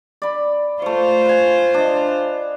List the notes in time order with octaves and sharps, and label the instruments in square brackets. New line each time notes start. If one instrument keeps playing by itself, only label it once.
[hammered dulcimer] D5 B5
[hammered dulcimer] A3 C#6 [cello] F4 C5
[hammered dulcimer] B4 G#5
D4 D#5